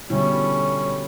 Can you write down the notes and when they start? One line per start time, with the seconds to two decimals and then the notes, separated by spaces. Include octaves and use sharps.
0.10 B2 D3 G3 C#4 E4